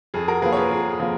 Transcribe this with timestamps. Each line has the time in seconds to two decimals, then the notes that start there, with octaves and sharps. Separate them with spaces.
0.14 F2 G#4
0.28 F#4 A#4
0.42 F3 A#3 G#4 B4
0.53 C#5
0.57 G#4 B4
0.71 F2 G#4
0.90 G#4
1.00 F3 A#3